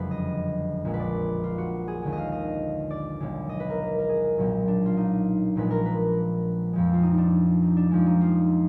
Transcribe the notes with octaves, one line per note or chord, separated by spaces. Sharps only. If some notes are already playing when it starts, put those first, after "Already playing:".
Already playing: F#1 F2 D3 G#3 B4
D#5
A#1 A#2 G#3
B4
D5
F4
F#4
G#4
D#2 D3 G#3
D#5
F5
D#5
D5
B1 B2 G#3
D#5
B4
A#4
A#4
G#4
B1 A#2 F#3
D4
F4
D#4
A#1 A#2 F3 G#3 B4
A#4
B4
F2 F3 G#3
F4
D#4
D4 D#4
D#4
D4
F2 F3 G#3 D4
D#4
F4